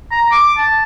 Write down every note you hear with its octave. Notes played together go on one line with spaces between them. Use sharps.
A#5
D6
A5